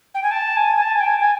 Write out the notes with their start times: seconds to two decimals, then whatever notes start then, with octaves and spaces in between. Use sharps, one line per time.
0.14 G5
0.23 G#5
0.31 A5
0.56 G#5
0.76 G#5
0.82 A5
0.95 G#5
1.00 G5
1.07 G#5
1.19 G#5